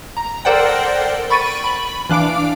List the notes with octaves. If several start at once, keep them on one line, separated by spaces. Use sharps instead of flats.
A#5
A4 A#4 C5 D5 F#5 G5
B5 C#6 A6 D7 D#7
B5 F#7
E3 D4 F5 D6 D7